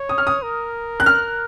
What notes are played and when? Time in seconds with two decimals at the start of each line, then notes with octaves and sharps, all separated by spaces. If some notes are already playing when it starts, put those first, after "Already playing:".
Already playing: C#5
0.09 D#6
0.18 F6
0.27 D#6
0.42 A#4
1.00 F#6
1.06 F6